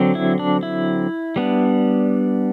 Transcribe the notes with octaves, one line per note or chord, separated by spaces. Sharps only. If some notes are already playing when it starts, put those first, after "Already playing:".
Already playing: D3 F#3 C4
E4
D4
E4
G3 B3 D4